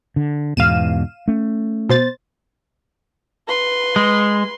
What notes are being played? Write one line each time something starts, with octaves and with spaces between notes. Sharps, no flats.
D3
E2 G#2 B2 F5 D#7 E7
A3 C#4
B2 C5 A6
B4 C6
G#3